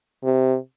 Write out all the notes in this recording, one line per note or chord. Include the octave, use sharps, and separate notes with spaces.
C3